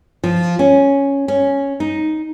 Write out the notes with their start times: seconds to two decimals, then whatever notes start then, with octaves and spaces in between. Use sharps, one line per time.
0.24 F3
0.59 C#4
1.28 C#4
1.80 D#4